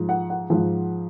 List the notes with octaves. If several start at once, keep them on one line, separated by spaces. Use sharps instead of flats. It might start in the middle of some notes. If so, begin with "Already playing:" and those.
Already playing: G#2 F3
F#5
F#5
G#2 F3